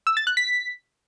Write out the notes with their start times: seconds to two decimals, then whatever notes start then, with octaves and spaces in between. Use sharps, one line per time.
0.07 E6
0.17 A6
0.27 F#6
0.37 B6